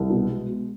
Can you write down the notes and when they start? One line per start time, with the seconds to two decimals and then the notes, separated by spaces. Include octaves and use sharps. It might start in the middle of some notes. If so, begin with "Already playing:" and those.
Already playing: C2
0.10 B2
0.29 G#3